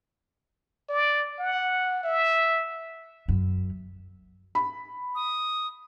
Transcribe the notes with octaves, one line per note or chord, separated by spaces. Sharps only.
D5
F#5
E5
F#2
B5
D#6